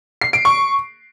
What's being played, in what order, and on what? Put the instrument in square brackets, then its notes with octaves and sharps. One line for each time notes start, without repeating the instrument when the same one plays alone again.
[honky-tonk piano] C7
D7
C#6